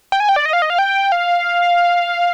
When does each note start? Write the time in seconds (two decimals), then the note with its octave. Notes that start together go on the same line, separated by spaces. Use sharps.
0.12 G5
0.20 G#5
0.29 G5
0.36 D5
0.46 D#5
0.53 F5
0.62 D#5
0.70 F5
0.79 G5
1.12 F5